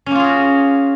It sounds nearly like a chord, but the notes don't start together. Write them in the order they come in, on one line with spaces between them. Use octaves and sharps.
C#4 A#3 F4 G#4 F#4